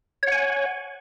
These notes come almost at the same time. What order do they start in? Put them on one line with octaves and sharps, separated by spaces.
C#5 F#5 G#5